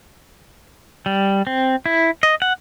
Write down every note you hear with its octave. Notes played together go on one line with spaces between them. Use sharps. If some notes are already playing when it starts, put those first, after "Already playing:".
G3
C4
E4
D#5
F#5